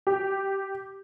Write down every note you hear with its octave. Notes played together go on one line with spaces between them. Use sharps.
G4